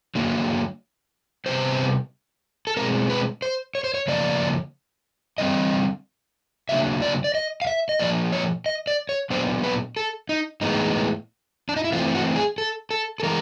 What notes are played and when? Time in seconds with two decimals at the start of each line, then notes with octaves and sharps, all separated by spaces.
0.15 D3 F#3 A#3
1.46 C3 D#3 G3 B3 C5
2.67 A4
2.77 B2 G#3 C4 A#4
3.10 B4
3.42 C5
3.75 C#5
3.84 C5
3.94 C#5
4.08 C#3 F3 A#3 D5
5.38 D3 G3 C4 D#5
6.69 C#3 F#3 A#3 D4 E5
7.02 D5
7.24 D5
7.35 D#5
7.62 F5
7.67 E5
7.89 D#5
8.00 A#2 F3 A#3 D5
8.33 C#5
8.66 D#5
8.87 D5
9.09 C#5
9.30 A#2 F#3 B3 D4 C5
9.64 B4
9.97 A4
10.29 D#4
10.61 A2 E3 G#3 B3 D#4
11.69 D4
11.76 D#4
11.84 E4
11.92 E3 A3 C4 F4
12.15 F#4
12.36 G#4
12.58 A4
12.91 A4
13.20 A4
13.23 E3 G#3 A#4